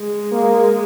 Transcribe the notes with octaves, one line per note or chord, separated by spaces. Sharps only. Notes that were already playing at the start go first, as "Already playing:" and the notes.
Already playing: G#3
A#3